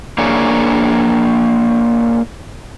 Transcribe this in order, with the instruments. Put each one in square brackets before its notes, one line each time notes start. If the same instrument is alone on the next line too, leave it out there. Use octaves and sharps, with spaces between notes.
[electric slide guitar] A#3 D4 G#4 C#5